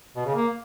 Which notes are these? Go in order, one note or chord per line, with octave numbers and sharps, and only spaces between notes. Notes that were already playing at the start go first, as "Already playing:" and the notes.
B2
C#3
A#3